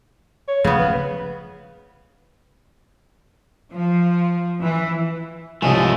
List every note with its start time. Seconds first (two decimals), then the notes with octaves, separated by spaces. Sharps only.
0.48 C#5
0.64 C#3 F3 A3 B3 C#4
0.79 F#1 F3 B4
3.74 F3
4.61 E3
5.62 C2 G#2 C#3 F3 A3 D#5 G#5